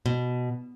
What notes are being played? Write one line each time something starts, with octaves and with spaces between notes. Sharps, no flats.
B2